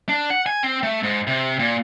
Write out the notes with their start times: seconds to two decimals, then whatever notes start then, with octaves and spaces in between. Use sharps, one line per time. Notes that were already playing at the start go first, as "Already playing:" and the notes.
0.09 D4
0.30 F#5
0.46 G#5
0.63 C4
0.83 A3
1.03 G#2
1.27 C3
1.59 A#2